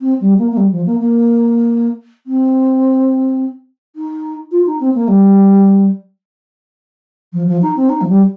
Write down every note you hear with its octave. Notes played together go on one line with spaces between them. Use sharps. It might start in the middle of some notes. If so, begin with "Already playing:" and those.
C4
G3
A#3
A#3
G3
F3
A#3
A#3
C4
D#4
F4
D#4
C4
A#3
G3
F3
F3
D#4
C4
D#4
F3
G3